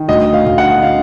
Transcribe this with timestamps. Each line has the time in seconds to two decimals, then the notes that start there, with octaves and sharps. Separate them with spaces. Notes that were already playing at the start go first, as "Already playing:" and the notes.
Already playing: D#3
0.08 D2 D#5
0.34 F5
0.46 D2
0.58 F#5
0.83 D3 F5